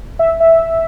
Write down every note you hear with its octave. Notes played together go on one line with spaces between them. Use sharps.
E5
E5